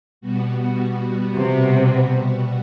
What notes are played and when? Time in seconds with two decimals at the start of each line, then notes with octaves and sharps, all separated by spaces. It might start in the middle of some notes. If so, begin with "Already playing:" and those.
0.21 B2 G3 B3 F#4
1.35 C3